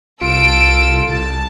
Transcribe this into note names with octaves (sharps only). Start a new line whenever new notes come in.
C2 F4 A4 E6 D7
C2 A5